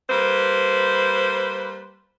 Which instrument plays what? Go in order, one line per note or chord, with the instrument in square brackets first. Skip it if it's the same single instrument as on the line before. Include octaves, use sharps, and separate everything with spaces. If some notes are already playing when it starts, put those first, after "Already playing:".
[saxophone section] G3 A#3 B4 C5